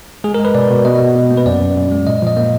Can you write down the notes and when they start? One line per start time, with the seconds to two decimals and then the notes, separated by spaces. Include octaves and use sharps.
0.24 G#3 G#4
0.34 A#4
0.40 G#3
0.45 B4
0.55 B2 D5
0.70 B2
0.85 B2 D#5
1.00 B2
1.15 B2
1.31 A#3
1.37 B4
1.46 F#2 D5
1.62 F#2
1.76 F#2
1.92 G#3
2.07 A#2 D#5
2.22 F3 D#5
2.37 A#3